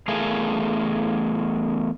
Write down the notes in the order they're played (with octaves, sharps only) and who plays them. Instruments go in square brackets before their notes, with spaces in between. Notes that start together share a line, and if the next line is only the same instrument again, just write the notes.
[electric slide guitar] E2 A3 G#4 A#4 F5